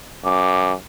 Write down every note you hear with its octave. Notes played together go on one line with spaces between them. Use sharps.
F#2 D6